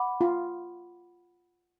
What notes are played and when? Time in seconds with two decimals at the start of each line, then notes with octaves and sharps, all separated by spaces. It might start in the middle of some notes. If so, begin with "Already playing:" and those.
Already playing: F#5 B5 D6
0.21 F4